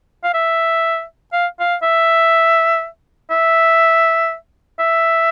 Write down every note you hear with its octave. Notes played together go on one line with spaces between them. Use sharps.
F5
E5
F5
F5
E5
E5
E5